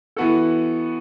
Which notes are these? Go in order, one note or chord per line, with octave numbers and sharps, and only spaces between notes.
E3 B3 F#4 A4